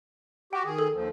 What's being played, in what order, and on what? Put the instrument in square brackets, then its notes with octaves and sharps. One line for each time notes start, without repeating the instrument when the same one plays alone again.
[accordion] F#4 G4 [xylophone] G5
[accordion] D#3 G#4
[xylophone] A4
[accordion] D#2 F3